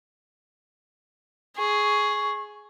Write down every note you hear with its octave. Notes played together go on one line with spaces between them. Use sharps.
G#4 C#6